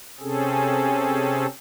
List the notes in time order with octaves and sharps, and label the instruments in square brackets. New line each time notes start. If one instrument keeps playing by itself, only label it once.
[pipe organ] C3 C4 C#4 G#4 A4